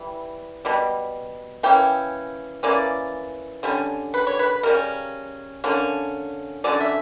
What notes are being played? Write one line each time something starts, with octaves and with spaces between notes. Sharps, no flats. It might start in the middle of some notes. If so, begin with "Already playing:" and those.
Already playing: E3 G3
B2 G3
E3 A#3 C#4 G5
E3 A#3 C#4 D5
D3 G3 C#4
B4
C#5
B4
C#3 G3 C#4 A#4
D3 A#3 C#4
D3 F#3 C#4 D5
E5